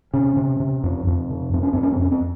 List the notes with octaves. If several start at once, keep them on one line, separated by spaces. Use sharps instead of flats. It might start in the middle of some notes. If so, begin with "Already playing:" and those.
C3 C#4
C3
C3
F2
F2
C3
F2 C4
C#4
F2 C4
C#4
C4
F2 C#4
C4